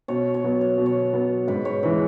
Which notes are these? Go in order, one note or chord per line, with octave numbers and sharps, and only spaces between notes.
B2 C#5
C#5
F#3 B3
C#5
B2
C#5
F#3 B3
G#2 B4
C#5
E3 G#3 B4